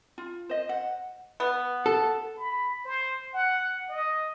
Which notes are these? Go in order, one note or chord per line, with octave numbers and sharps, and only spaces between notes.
F4
C5 D#5
F#5
B3
A4
B5
C5
F#5
D#5